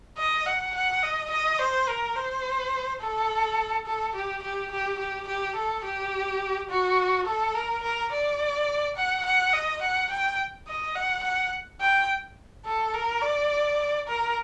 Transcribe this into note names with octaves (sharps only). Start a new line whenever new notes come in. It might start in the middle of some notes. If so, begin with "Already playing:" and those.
D#5
F#5
F#5
D#5
D#5
C5
A#4
C5
A4
A4
G4
G4
G4
G4
G4
A4
G4
F#4
A4
A#4
A#4
D5
F#5
F#5
D#5
F#5
G5
D#5
F#5
F#5
G5
A4
A#4
D5
A#4